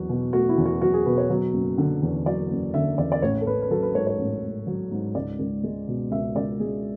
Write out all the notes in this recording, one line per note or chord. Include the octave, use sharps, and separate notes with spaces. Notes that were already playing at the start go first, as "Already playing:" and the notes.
Already playing: E2 F#3 F#4
B2
A3 F#4
E4
E2
F#4
F#3 F#4
G#4
B2 B4
C#5
F#3
F#1
D3
E2
F#3 D5
F#1
D3 E5
E2 D5
D5
A1 C#5
A4
A1 B4
B4
F#3 A4
B4
G#2 C#5
C#5
A1
A1
F#3
G#2
C#2 D5
C#2
G#3
B2
C#2 E5
C#2 D5
G#3 G#4